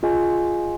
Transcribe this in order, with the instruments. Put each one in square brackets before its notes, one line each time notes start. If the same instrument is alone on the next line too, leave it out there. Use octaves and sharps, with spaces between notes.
[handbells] F4 G#4 D#5 G#5